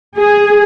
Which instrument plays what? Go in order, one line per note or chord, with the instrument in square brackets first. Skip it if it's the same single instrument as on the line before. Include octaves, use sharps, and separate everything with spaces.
[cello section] G#4